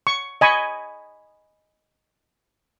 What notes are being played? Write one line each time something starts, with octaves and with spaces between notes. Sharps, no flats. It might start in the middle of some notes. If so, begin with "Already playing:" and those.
C#6
D#5 G#5 B5 C#6